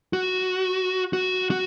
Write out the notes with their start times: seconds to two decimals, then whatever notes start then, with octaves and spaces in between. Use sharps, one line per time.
0.13 F#4
1.13 F#4
1.51 F#4